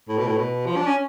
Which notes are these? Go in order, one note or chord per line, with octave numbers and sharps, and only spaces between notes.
A2
B2
A2
B2
F3
D4
C#4